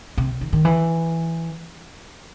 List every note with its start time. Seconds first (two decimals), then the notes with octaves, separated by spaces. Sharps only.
0.17 C3
0.41 D#3
0.53 D#3
0.65 E3